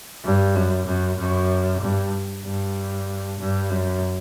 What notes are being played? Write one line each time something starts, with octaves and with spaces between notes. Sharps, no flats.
G2
F#2
F#2
F#2
G2
G2
G2
F#2